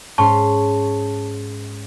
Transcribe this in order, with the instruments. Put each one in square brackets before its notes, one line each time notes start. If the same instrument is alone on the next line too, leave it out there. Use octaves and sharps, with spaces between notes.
[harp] G#2 C#4 C6 [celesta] A5 C#6